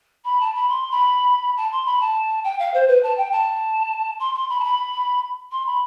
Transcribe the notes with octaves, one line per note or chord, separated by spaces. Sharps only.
B5
A5
B5
C6
B5
A5
C6
B5
A5
G5
F5
C5
B4
A5
G5
A5
C6
C6
B5
A5
B5
C6
B5